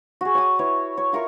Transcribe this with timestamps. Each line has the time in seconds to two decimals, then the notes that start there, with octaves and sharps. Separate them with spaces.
0.21 F#4 G#4
0.35 C#5 A5 D#6
0.59 E4 B4 C#5
0.97 C#5
1.13 F4 A#4 E5 C#6